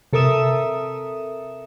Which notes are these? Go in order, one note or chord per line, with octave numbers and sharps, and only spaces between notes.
C3 A4 A#4 E5 D#6 E7